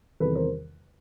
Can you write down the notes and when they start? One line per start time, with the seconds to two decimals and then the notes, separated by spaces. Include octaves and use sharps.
0.20 E2 C3 D#3 G3 A4 B4
0.35 A#4 C5